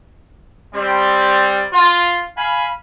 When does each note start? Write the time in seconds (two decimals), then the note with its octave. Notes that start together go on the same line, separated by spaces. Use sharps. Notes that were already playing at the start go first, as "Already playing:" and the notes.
0.74 G3 C4
1.73 F4
2.37 F5 G#5 B5